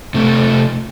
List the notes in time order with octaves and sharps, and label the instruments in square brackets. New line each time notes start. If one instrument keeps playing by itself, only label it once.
[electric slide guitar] C3 A3 C4